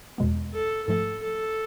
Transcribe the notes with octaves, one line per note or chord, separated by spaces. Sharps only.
E2 B2 G#3 B3
A4
G#2 F3 A3 A4
A4